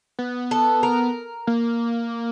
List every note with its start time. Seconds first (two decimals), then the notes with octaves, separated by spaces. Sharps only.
0.19 B3
0.51 A4
0.83 A#4
1.47 A#3